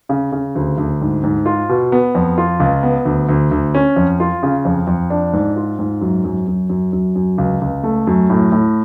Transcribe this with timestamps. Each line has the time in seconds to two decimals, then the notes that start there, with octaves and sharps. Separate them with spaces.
0.09 C#3
0.32 C#3
0.55 D2
0.78 D2
1.01 G#2
1.24 G#2
1.46 F4
1.69 B2
1.92 B3
2.15 F2
2.38 F4
2.60 C#2
2.83 B3
3.05 D2
3.29 D2
3.51 D2
3.74 C#4
3.96 F2
4.20 F4
4.43 C#3
4.65 F2
4.87 F2
5.10 D4
5.33 G#2
5.56 F4
5.79 G#2
6.01 F#2
6.24 F#2
6.48 F#2
6.69 F#2
6.93 F#2
7.15 F#2
7.38 C#2
7.61 C#2
7.83 A3
8.07 F#2
8.30 A2
8.52 A2